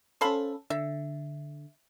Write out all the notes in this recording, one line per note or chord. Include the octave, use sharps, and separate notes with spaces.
C#4 A4 C5 F5 B5
D3 E5